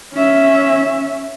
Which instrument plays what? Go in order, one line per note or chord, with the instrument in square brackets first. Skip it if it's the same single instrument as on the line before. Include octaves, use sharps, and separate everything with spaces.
[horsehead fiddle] C#4 E5